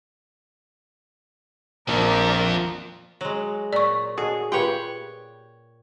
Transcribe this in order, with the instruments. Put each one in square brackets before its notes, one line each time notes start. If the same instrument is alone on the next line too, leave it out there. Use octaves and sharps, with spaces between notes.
[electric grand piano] A#1 [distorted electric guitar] F2 F3 [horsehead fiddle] A#4 D5
[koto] F#3 G#3
[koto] A#2 [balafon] D5 C#6
[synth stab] F#4 A4 D#5 [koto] G#4
[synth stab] F4 G4 B4 [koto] C#5 F#5 G5